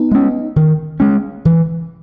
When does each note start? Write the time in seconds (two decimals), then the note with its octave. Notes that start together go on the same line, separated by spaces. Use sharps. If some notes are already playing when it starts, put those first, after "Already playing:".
Already playing: B3 D#4
0.11 G#3 C#4
0.56 D#3
1.00 G#3 C#4
1.45 E3